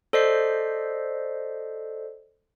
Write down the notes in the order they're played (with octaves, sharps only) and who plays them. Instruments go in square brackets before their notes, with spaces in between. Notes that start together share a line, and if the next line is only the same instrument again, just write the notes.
[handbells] A4 C5 D5 D#5 B6 C7